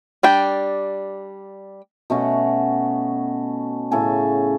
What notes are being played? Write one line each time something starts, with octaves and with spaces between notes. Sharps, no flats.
G3 D4 G5
B2 A3 C#4 F#4
A2 C#3 A4 G#5